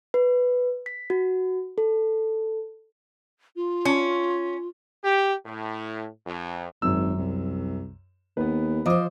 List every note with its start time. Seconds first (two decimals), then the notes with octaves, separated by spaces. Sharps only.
0.14 B4
0.86 B6
1.10 F#4
1.78 A4
3.56 F4
3.85 C#4
5.04 G4
5.46 A2
6.27 F2
6.82 G#1 F#2 E6
7.18 C2
8.37 D#2 B3 B4
8.86 F3 C5 D#5 D6 D#6